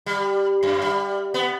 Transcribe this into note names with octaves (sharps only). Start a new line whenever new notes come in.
G3
F#2
G3
B3